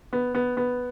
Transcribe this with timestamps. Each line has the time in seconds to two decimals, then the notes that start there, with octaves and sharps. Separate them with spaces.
0.13 B3
0.35 B3
0.57 B3